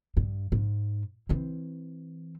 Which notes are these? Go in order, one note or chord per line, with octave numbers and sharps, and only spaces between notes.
G2
G#2
E3 C4